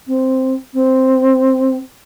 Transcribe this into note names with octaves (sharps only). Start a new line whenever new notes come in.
C4
C4